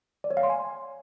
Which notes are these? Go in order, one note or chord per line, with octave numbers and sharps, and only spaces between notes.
D5
C#5
F5
C6
G#5